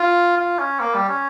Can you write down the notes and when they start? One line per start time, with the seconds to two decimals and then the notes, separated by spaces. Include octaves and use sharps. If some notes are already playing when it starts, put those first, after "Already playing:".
Already playing: F4
0.37 F4
0.58 C#4
0.80 A#3
0.94 G3
1.09 C#4